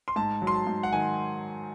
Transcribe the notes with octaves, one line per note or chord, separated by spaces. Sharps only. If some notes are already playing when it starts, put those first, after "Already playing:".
C6
G#2 A5
F#3
C6
A5
G#2
F#5
D#3 G#5